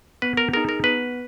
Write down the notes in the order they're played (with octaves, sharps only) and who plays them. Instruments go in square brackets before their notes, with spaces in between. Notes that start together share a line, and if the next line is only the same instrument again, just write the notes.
[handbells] B3 [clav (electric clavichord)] B4
[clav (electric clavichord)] A#4
[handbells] D#4 G#4 [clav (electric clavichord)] A#4
[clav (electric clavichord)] A#4
[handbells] B3 [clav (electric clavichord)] B4